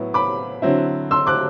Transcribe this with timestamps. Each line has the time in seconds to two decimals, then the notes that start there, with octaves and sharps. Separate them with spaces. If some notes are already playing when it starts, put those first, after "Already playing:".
Already playing: A2 F#3 B3 E4
0.14 B5 D6
0.62 D3 F#3 C4 E4
1.11 C6 E6
1.27 D6 F#6